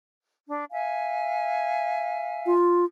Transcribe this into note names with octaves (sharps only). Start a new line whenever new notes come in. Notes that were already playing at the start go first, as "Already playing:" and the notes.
D4
E5 F5 G#5
F4